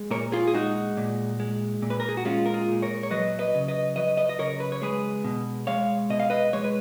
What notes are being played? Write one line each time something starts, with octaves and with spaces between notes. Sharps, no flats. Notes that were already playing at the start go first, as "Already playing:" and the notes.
Already playing: G#3
A#2 A#4 C#5
F4 G#4
G#4
G#3 D#4 F#4
A#2
G#3
A#2
B4
A#4
G#4
F#4
G#3 C#4 F4
A#4
F4 G#4
A#2
A#4 C#5
C#5
F#3 B4 D#5
B4 D#5
C#3
B4 D#5
F#3 B4 D#5
B4 D#5
D#5
C#3 A#4 C#5
B4
C#5
G#3 G#4 B4
B2
G#3 C#5 F5
B2 D#5
F5
B4 D#5
G#3 C#5
B4